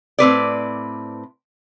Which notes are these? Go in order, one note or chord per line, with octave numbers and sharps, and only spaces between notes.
A2 C4 B4 D5